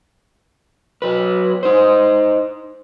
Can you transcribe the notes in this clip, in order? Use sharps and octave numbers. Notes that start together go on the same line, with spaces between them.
F#3 B4
D#4 C5